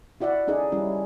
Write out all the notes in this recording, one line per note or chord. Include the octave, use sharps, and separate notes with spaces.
E4 F#4 D5 E5 F#5
C#4 D#4 G#4 A4 D5 D#5
G3 C#4 E4